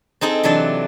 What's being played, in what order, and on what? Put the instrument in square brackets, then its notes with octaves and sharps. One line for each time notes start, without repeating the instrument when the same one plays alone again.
[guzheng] C4 D#4 G#4 A4
C3 E3 F#3 D4 A5